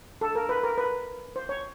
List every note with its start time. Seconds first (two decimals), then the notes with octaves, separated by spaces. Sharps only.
0.21 A4
0.35 A#4
0.49 B4
0.63 A#4
0.78 B4
1.36 C5
1.49 C#5